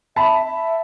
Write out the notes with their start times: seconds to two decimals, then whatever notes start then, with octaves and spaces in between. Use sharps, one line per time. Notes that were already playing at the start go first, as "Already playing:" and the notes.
0.16 E5 A5 B5
0.44 E5